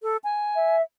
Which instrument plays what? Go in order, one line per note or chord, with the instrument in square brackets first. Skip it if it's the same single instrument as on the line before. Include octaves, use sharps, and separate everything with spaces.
[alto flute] A4
G#5
[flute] E5